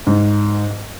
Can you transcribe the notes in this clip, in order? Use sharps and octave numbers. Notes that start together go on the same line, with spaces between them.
G#2